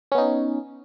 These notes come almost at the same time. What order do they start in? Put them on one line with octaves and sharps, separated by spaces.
C#4 B3 D#4